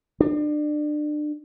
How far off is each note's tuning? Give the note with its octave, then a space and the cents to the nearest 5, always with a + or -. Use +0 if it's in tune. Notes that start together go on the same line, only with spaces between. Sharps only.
D4 +30